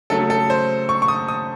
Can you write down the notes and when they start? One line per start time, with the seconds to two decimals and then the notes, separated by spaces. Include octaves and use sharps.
0.10 C#3 F#3 A3 A4
0.30 A4
0.50 C5
0.89 C#6
1.02 C#6
1.08 D#6
1.28 D#6